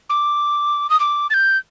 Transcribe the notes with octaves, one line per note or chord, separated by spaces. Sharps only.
D6
D#6
D6
A6
G6